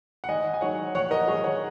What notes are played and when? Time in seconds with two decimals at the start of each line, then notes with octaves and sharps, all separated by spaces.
0.24 F#5
0.29 G#1 D#5 G#5
0.54 G#5
0.61 G#2 D#3 F#3 C#5 F#5
0.95 A#1 C#5 F#5
1.11 A#4 D#5
1.28 G#2 D#3 F#3 G#4 C#5
1.44 C#5 F#5